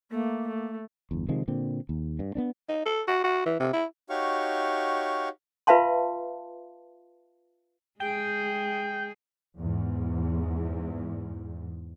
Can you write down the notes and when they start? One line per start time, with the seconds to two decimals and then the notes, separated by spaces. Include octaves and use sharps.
0.11 A3 A#3
0.48 A3
1.11 G1 E2
1.29 C3 D#3 F3 G#3
1.48 A#2 D3 C4
1.89 D#2
2.19 G2
2.35 B3 C4 D4
2.69 D#4
2.86 A4
3.07 F#4
3.24 F#4
3.46 E3
3.60 C3
3.73 E4
4.10 D#4 F#4 G4 C#5 F5 C#6
5.67 F4 B4 E5 F5 A5 C6
8.00 G#3 G#4 G5
9.59 E2 G#2